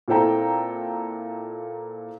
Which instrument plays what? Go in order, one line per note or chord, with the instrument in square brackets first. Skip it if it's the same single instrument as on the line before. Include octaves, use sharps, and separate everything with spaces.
[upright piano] A#2 C4 E4 A4 G5 A#5